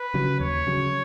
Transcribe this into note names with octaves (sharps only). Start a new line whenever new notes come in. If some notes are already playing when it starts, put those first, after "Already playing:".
Already playing: B4
C#3 F#3
D#2 C#5
C#3 F#3